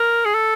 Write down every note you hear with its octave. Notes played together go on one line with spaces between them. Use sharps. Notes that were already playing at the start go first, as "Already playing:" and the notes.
Already playing: A#4
G#4
A4